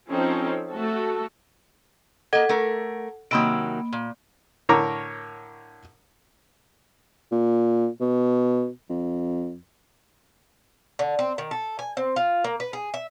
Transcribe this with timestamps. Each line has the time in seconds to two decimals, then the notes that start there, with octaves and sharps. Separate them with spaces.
0.10 F3 C4 C#4 D#4 A4
0.73 A3 F#4 A4
2.33 A#3 A4 D#5 F#5 G#6
2.49 A3 A#4
3.31 C3 D#3 F#3 A#3 B5 D7
3.93 A#2
4.69 A2 D3 A#4 C#5 A#5 D6
7.32 A#2
8.00 B2
8.89 F2
10.99 D3
11.19 C4
11.38 D#3
11.51 A4
11.79 G#5
11.97 C4
12.16 F4
12.44 A#3
12.60 B4
12.73 G#4
12.94 E5